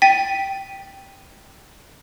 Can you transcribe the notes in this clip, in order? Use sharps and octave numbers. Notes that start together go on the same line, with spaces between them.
G5 A6 B6 D#7